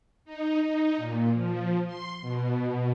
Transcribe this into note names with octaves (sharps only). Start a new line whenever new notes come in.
D#4
D#4
A#2
F3
C6
B2